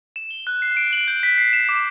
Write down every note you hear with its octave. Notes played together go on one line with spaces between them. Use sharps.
E7
G7
F#6
C7
D7
F#7
G6
B6
C7
E7
D6